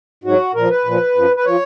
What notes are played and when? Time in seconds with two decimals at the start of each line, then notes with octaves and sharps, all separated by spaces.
0.24 G#2 F#3 F#4
0.54 A#2 F3 A#4
0.69 B4
0.85 A#2 F3
1.15 F#2 F3
1.36 B4
1.46 F3 C#5